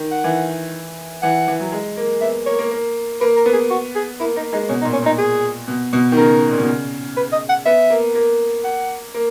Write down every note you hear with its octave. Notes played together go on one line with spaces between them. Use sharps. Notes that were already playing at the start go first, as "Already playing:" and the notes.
Already playing: D#3
F#5
E3
E3 F#5
E3
F#3
G#3
A#3
B3 E5
A#3 C#5
A#3
A#3
A#3 B4
A#4
B3
G#4
F#4
G#4
A#3 E4
A#3 D#4
G#3 D#4
B2 C#4
D#4
A#2
C#4
A#2 D#4
G#4
B2
B2
D#3
C#3 A#4
A#2
B2
C#3
B4
D#5
F#5
B3 E5
A#3
A#3
F#5
A#3